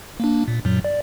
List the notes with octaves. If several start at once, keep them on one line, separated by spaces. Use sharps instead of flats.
A#3 D4
A#2
F#2 A#2 F#3
D5